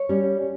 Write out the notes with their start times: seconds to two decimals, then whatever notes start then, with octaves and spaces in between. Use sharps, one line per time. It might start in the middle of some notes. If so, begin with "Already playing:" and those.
Already playing: C#5
0.09 G3 C#4